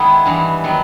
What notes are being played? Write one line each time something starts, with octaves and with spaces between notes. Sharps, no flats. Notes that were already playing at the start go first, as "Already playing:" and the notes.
Already playing: D#3 G#3 B3 E4 G#4
G2 E3 G#3
D#3 F#3 B3